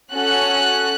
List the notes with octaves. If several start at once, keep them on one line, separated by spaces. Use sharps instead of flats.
C#4 F#4 A4 F#6